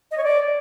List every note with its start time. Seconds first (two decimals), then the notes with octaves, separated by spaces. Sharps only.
0.11 D#5
0.17 C#5
0.24 D5